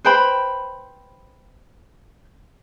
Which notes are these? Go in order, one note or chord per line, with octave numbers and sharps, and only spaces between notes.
B4 C5 G5 B5